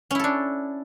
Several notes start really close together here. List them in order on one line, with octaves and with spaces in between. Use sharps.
C#4 E4 A4 D4